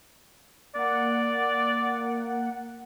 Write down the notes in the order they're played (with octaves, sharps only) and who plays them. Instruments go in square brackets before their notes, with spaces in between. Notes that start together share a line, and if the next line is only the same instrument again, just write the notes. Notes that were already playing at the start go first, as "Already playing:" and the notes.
[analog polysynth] A#3 F#5 [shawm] D5